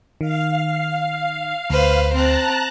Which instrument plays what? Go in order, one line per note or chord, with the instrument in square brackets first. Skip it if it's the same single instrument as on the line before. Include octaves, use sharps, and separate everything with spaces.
[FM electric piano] D#3 [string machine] F5
[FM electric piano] D2 [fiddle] B4 C5
[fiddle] C4 [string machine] A5 A#5 F#6